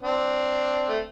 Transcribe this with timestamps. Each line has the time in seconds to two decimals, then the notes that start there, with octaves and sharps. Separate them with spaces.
0.02 C4 D4
0.89 A3